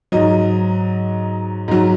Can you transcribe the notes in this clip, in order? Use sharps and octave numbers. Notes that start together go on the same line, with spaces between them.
G#2 F#3 D#5
G#2 F#3